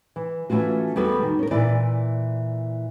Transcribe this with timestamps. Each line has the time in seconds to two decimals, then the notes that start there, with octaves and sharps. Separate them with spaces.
0.16 E3
0.50 E3 A3 C#4 F4 F#4
0.96 E2 G3 B3 F#4 A4
1.22 D#3
1.39 C#4 A#4
1.51 A#2 E3 E4 D5